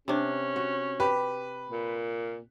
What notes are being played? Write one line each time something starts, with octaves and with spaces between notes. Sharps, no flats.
C3 C#4 D4
F#4
G4 B4
A#2